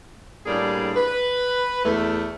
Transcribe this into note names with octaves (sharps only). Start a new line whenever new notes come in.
A2 G3 A#3 D4 G#4
B4
E2 A3